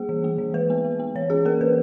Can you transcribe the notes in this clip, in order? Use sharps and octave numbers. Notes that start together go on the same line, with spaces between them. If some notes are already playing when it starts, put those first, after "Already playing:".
Already playing: G3 A#3 G#4
E3
A#3
E3
G#3 B4
B3
G#3
B3
E3 C#5
C#4 G#4
A#3 A#4
E3 B4